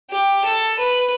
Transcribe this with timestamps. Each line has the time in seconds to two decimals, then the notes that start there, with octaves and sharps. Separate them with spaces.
0.10 G4
0.44 A4
0.79 B4